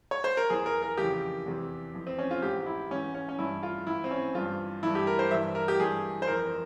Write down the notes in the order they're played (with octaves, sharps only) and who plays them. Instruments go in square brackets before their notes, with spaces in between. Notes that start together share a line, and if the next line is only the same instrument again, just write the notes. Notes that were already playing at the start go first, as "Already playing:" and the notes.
[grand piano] C#5
C5
A#4
E2 E3 G#4
A#4
A#4
F2 C#3 E3 G4
E2 C3 E3
F2 E3
C4
C#4
F4
G#2 E3 G4
E4
G#2 E3 C#4
C#4
C#4
G2 E3 E4
F4
G#2 E3 E4
C4
C#4
G2 E3 F4
G2 E3 E4
G4
A#4
C5
G2 E3 E5
A#4
G4
G2 E3 G#4
C5
F2 E3 A#4